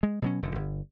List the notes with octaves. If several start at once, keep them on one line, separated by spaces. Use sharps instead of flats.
G#3
B2 F#3 C#4
F1 F#2 D3
G1